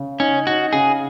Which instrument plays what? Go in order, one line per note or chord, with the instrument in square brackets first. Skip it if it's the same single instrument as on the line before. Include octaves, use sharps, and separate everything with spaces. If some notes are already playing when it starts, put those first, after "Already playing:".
Already playing: [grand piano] C#3
[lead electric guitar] C#4 [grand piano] D#4
[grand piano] D#4 [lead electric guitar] F#4
[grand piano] C#3 [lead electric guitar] G#4